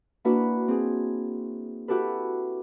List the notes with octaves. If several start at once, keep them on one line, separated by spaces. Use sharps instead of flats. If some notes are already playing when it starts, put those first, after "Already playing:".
A#3 D4 E4 F#4 B4
C4 G#4
E4 F#4 G4 A4 B4